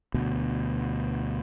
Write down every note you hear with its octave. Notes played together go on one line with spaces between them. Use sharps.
D2 B2